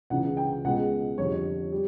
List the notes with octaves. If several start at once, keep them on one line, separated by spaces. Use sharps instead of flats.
C#2 C#3 E3 F#5
G5
C#2 B2 G#3 F#5
F2 D3 G3 C#5
G3